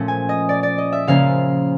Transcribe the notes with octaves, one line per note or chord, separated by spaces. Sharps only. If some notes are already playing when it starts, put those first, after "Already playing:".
Already playing: A#2 F3 A3 C#4
G#5
D#5
D5
D5
D#5
E5
C#3 F3 A#3 C#4 F5